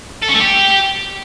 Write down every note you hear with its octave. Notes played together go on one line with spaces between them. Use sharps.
A4
C#4
A3
G4